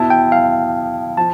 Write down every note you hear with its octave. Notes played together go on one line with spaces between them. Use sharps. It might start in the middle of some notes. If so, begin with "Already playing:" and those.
Already playing: B2 B3 E4 A5
G5
F5
F3 A5